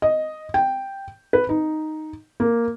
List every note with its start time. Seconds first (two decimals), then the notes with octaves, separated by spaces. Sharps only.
0.02 D#5
0.54 G5
1.33 B4
1.49 D#4
2.40 A#3